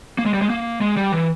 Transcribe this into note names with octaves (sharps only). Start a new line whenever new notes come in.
A#3
G#3
G3
G#3
A#3
G#3
G3
E3